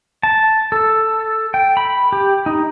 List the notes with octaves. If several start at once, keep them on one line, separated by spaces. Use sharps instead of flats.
A5
A4
G5
B5
G4
D#4